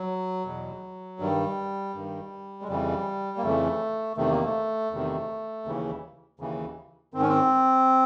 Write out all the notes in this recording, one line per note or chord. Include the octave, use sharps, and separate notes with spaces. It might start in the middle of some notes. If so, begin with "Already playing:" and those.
Already playing: F#3
E2 B2
G2 D#3 G3
G2 D#3
G#3
F2 C#3 E3 G3
A#3
F2 C#3 E3 A3
E2 C3 D#3 A3
A#3
A3
E2 C3 D#3
D#2 C#3 E3
D#2 C#3 E3
G#2 D#3 C4
C#4
C4